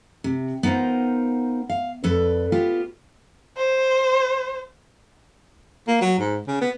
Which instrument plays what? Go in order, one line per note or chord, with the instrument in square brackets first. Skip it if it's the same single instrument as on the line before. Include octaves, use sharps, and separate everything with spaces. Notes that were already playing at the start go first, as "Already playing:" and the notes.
[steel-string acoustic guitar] C3
B3 D#4 F4 A#4 C5
F5
F2 A4 B4 D5
B3 F4 G4
[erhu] C5
[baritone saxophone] A#3
F#3
G#2
C#3
B3